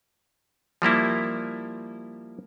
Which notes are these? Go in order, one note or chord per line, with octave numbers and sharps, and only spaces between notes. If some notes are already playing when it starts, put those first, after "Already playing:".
F3 G3 A#3 E4